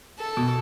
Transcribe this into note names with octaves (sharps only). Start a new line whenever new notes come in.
A4
B2